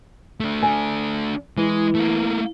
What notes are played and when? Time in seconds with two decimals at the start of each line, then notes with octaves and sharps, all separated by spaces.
0.40 A3 D4
0.63 G#5
1.57 E3 G#3
1.95 A3 A#3